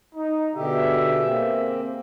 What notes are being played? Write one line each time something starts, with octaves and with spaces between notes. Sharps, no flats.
D#4
B2 D3 B3 G4 G#4 E5
A#3 C4